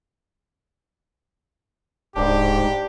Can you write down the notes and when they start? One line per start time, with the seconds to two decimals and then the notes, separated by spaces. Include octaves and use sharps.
2.16 D1 G#2 D4 G4 C5 B5